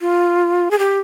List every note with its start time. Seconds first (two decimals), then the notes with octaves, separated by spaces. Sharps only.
0.01 F4
0.71 G#4
0.79 G4